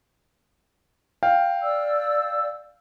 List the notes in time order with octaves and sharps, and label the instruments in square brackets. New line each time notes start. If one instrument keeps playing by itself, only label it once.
[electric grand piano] F5 G5
[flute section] D5 E6